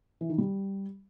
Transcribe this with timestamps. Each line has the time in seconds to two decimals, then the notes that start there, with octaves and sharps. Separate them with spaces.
0.21 E3
0.30 D#3
0.38 G3